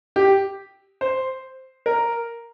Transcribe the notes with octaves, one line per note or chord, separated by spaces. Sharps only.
G4
C5
A#4